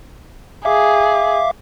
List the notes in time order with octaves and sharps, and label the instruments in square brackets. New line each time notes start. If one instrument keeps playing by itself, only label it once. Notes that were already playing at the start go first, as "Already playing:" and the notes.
[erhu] G#4 [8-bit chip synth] E5 F5 D6